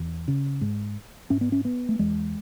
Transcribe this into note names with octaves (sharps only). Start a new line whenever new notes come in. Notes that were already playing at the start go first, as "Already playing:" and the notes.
Already playing: E2
C#3
G#2
G#2 C#4
B3
C#4
B3
A3
E2 G#3